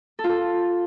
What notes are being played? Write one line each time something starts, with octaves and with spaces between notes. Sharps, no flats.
A4
F4
A4